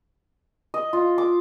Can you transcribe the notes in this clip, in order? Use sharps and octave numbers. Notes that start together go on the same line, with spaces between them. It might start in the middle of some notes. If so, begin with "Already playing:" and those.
D#5
F4
D6